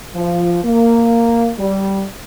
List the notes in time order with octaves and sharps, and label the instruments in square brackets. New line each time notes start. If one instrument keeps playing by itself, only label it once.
[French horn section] F3
A#3
G3